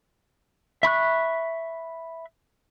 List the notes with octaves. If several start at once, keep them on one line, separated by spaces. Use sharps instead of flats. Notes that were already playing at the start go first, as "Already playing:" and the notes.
E5 B5 C#6 F#6